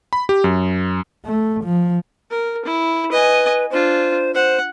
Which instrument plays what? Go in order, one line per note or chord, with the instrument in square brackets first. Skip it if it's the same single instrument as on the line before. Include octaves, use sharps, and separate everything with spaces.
[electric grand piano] B5
G4
F#2
[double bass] A3
F3
[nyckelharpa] A#4
E4
[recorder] B4 [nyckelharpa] D#5 G#5
[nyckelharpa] D4 F4 [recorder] C5
[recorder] C5 [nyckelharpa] F#5